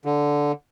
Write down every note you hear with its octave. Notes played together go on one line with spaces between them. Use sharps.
D3